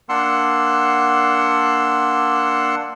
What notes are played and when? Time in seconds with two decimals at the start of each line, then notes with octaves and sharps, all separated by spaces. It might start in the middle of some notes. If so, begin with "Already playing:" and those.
0.09 A#3 D4 F#5 C6 E6 F#6